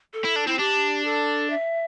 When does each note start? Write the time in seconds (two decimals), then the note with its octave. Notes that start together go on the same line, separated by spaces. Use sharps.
0.13 A4
0.24 E4
0.36 D4
0.47 C4 E4
0.59 D4 G4
1.05 A4
1.50 E5